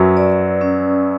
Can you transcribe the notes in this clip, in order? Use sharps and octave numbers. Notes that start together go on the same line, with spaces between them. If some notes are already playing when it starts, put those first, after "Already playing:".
Already playing: F#2 F#3 B4
D5
C#4